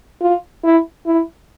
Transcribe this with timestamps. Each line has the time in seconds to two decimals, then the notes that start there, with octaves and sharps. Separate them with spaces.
0.21 F4
0.64 E4
1.07 E4